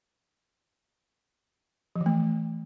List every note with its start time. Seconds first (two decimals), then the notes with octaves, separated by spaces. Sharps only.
1.96 F3
2.01 E3
2.06 A3